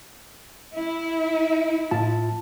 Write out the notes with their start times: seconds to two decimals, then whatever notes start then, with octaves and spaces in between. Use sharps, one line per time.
0.75 E4
1.91 A2 F4 A5